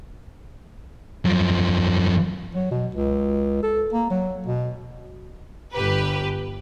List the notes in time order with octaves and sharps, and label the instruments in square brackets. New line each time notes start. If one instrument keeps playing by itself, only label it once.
[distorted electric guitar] F#2 F3
[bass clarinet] F#3
B2
C#2
A4
A#3
F#3
B2
[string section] G1 G4 B4